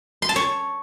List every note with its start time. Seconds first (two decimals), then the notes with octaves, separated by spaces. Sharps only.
0.22 C6
0.29 A5
0.36 C#5